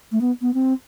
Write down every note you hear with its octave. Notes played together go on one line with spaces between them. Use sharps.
A3
B3
B3
C4